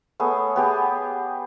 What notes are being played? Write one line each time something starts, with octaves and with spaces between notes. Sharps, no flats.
A3 B3 G#4 C#5
B3 G4 G#4